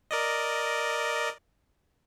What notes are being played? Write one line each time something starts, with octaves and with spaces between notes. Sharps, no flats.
A#4 D5 D#5